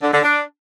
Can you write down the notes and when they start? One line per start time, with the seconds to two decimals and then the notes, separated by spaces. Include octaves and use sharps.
0.02 D3
0.13 D3
0.23 D4